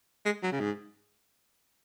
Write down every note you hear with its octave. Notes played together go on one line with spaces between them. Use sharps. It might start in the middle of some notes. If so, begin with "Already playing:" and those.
G#3
F#3
C#3
G#2